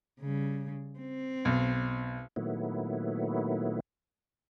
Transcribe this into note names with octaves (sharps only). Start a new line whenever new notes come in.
C#3 G3
C4
B1
A#2 D#3 F#3 A3 B3 E4